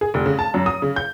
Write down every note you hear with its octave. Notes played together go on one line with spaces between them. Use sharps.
G#4
F1
C#3
A5
F#2
D#6
C#3
G6